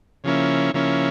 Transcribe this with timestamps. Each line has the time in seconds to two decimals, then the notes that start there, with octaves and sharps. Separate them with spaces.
0.24 C#3 F3 A#3 C#4 E4
0.74 C#3 F3 A#3 C#4 E4